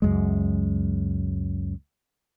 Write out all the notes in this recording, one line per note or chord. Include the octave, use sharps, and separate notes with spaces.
C#2 F#2 G#3